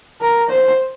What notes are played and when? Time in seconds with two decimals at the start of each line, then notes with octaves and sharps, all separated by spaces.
0.21 A#4
0.50 C5